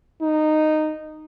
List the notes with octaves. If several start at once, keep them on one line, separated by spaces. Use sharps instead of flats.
D#4